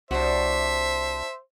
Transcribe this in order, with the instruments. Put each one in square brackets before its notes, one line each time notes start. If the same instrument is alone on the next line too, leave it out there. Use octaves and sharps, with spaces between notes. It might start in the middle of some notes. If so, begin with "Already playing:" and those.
[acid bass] C2 [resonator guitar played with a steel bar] D4 F#4 [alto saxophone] C5 [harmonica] E5